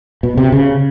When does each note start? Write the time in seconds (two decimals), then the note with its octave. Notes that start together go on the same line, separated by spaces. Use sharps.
0.23 B2
0.37 C3
0.52 C#3